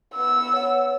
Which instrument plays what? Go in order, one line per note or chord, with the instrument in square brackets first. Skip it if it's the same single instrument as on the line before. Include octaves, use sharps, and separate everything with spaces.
[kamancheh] B3 E6
[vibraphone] C#5 F#5